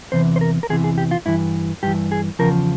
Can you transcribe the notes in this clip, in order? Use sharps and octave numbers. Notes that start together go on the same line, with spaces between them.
E2 C3 E3 C5
C5
A#4
A#4
E2 C3 E3 G#4
G#4
G4
F4
G2 E3 E4
G2 E3 G4
G#4
E2 C#3 F3 A#4